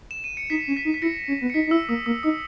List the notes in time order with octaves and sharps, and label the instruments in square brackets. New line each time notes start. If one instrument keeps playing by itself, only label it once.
[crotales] E7
D#7
C#7
[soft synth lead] D#4 [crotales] B6
[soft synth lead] C#4
[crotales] B6
[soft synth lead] D#4
[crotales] B6
[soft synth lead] E4 [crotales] A#6 C#7
[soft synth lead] C#4
B3
[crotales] C#7
[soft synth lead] D#4 [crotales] B6
[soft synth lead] D#4
[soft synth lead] E4 [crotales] E6
[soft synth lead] A#3 [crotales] D#6
[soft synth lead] A#3 [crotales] D#6
[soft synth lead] D#4 [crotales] D#6